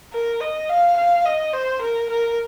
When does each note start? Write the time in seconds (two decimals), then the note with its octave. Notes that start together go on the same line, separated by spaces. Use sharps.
0.13 A#4
0.41 D#5
0.69 F5
0.97 F5
1.25 D#5
1.53 C5
1.82 A#4
2.10 A#4